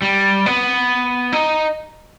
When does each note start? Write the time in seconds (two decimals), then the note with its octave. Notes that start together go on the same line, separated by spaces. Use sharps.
0.02 G3
0.46 B3
1.32 D#4